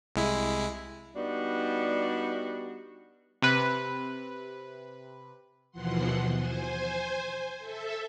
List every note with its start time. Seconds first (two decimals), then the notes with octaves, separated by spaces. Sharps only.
0.16 C2 G#3 E4
1.15 G3 B3 D4 D#4 F#4
3.42 C3 B4
5.71 D#2 B2 E3 F3 F#5 C6
6.32 C5 G#5
7.58 A4 E5